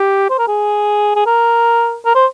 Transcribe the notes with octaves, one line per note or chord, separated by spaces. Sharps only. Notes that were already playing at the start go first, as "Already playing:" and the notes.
Already playing: G4
C5
A#4
G#4
G#4
A#4
A#4
C5